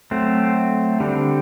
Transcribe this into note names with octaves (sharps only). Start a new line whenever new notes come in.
F#3 A3 C4
D3 G3 C4